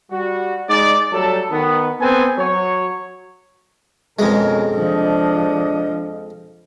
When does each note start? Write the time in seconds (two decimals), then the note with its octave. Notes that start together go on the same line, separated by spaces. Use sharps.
0.11 G3 F#4
0.70 G#3 D#4 D5
1.12 F#3 G3 A3 A4
1.51 D#3 B3
2.01 B3 C4 A4 B4 G#5
2.38 F#3 C#5
4.19 F2 B2 G#3 C#4 A#4
4.74 F3 D4 D#5